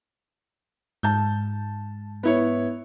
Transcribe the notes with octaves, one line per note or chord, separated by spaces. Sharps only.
G#2 A5 G6
B3 E4 C#5